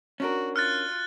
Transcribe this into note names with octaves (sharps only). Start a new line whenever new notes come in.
C#4 D4 F#4 A#4
F4 F6 F#6 A6